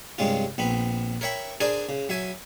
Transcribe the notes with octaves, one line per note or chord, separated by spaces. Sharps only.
G2 C3 G#3 C#4 F4
A#1 B3 C4 B5
A#4 C#5 E5 G5 B5
D4 G#4 A#4 C5 D5 G#5
C#3
F#3 E5 G#5